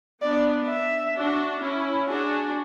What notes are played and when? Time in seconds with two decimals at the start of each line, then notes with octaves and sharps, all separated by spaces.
0.22 B3 D4 D5
0.68 E5
1.15 D4 F#4
1.61 C#4 E4
2.08 D4 F#4 G#4